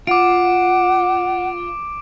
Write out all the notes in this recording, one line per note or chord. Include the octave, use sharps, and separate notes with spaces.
F4 F#5 D6 D7